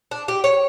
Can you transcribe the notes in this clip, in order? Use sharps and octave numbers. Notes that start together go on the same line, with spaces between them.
D4
G4
C#5